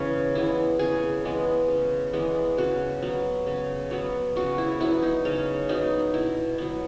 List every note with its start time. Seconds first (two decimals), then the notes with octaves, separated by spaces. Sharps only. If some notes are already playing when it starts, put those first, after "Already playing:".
Already playing: C#3 E3 G#3 B3 C#4
0.35 E3 G#3 B3 E4
0.79 C#3 G#4
1.25 E3 G#3 B3
1.68 C#3
2.13 E3 G#3 B3
2.58 C#3 F#4
3.02 F#3 B3
3.46 C#3
3.91 F#3 B3
4.36 C#3 F#4
4.58 E4
4.80 F#3 B3 E4
5.02 D#4
5.25 C#3 C#4
5.69 F#3 B3 D#4
6.14 B2 E4
6.58 F#3 B3